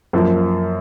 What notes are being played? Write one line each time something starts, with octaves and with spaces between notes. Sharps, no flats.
F#2 F3 A#3